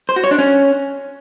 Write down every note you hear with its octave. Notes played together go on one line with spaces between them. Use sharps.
C5
F#4
C#5
D4
C#4